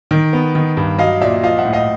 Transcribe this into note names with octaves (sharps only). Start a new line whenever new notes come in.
D#3
B3
D#3
G2
F#3 D#5 F5
A#2 D5 E5
F3 D#5 F5
E5 F#5
A2
D#5 F5